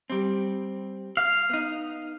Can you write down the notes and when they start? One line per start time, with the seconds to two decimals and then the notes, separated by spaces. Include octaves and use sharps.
0.10 G3 C4
1.17 F5
1.50 B3 D#4